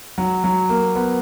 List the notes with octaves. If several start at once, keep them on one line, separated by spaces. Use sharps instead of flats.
F#3
F#3
A#3
B3